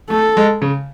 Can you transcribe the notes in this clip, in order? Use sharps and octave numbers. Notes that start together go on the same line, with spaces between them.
A3 A4
G#3
C#3